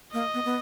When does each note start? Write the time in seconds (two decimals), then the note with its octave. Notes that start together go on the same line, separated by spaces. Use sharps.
0.13 A#3 D#5
0.34 B3
0.45 B3